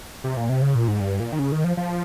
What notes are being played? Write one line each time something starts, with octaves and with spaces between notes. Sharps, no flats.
C3
A#2
C3
C#3
A#2
G#2
G2
A#2
D#3
C#3
D#3
F3
F3